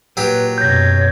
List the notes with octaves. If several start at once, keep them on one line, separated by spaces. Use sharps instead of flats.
A#2 F#3 G4 B4
F#2 B2 C#5 G6 A#6